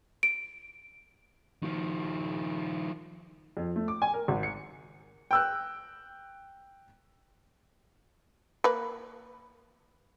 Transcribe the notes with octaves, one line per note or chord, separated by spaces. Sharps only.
D7
D#3 F3
F2
A3
D6
G#5
A#4
G#1
C#7
G5 E6 F#6
A#3 B4